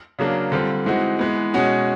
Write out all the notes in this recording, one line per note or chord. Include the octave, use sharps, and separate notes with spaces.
C#3 F#3 A#3 D4
D3 G3 C4 F4
E3 G#3 C4 D#4 F#4
E3 G#3 B3
B2 G#3 C#4 F#4